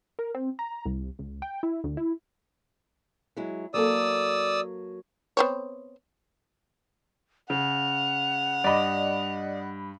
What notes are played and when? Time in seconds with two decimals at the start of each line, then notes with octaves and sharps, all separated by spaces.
0.19 A#4
0.35 C4
0.59 A#5
0.86 C2
1.19 C#2
1.42 G5
1.63 E4
1.84 D2
1.97 E4
3.37 F#3 G#3 E4
3.74 F#3 A#3 A4 D5 D#6 E6
5.37 B3 C4 C#5
7.50 C#3 F#5 F7
8.64 G2 D5 D#5 B5